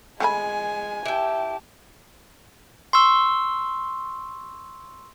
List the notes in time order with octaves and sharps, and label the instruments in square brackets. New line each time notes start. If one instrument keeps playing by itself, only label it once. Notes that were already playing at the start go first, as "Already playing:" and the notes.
[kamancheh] G#3 [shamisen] A3 A4 B5 [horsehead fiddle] G#5
[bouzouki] E4 G5 [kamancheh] G4 A5
[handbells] C6 C#6 E6